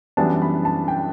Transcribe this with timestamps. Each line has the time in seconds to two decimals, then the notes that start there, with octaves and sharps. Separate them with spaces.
0.17 F#2 E3 G3 B3 D4 A5
0.42 B5
0.65 A5
0.88 G5